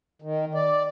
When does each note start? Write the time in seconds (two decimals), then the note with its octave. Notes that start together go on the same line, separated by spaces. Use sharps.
0.22 D#3
0.54 D5